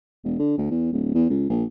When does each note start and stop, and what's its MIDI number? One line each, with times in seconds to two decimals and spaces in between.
0.24 0.36 28
0.39 0.55 50
0.58 0.69 38
0.71 0.91 40
0.92 1.12 26
1.15 1.25 40
1.30 1.48 37
1.49 1.64 34